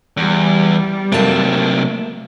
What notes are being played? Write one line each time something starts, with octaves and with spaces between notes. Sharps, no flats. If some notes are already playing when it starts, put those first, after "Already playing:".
E2 G3
C3 F#3 A3 A#3 A5